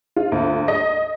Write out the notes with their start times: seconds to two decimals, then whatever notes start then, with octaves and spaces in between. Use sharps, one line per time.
0.16 F4
0.32 D2
0.68 D#5